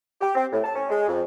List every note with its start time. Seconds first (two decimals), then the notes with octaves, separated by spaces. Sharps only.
0.21 G4
0.35 C4
0.52 A2
0.64 A5
0.75 C#4
0.89 G#3
1.08 F2